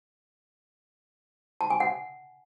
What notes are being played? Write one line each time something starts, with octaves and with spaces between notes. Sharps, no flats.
A5
G#5
F#5